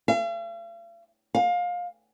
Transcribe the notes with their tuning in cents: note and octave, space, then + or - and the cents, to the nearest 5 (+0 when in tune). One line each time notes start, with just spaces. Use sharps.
F5 -45
F5 +25